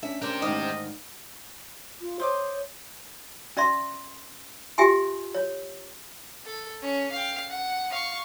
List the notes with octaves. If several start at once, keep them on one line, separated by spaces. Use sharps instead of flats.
C#4 D4 E5
G4 A#4 C5 D5
D2 G#2 D#3 D#5
F4
C5 C#5 D#5 D6
C#4 D5 E5 C6
F4 G4 E5 G5 G#5 C6
C#5
A4
C#4
F5 G5
F#5
F5 C#6